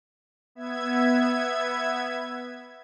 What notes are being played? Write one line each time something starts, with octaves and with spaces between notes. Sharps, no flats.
B3 E5 G#6